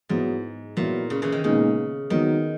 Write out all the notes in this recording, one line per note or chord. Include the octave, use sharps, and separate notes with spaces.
G#2 F#3 B3 E4
A#2 F#3 B3 E4
C#3
C#3 E3
D#3
A#2 C#3 G#3 B3 D#4
D#3 F#3 B3 D#4